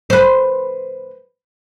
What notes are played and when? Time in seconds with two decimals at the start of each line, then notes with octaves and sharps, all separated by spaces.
0.10 B4 C5